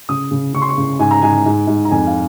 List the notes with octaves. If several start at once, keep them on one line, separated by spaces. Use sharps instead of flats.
C#3 D#6
C#3
C#3 C#6
C6
C#6
C#3
G#2 G#5
A#5
G#2 G#5
G#2
G#2
A#5
F2 G#5
F5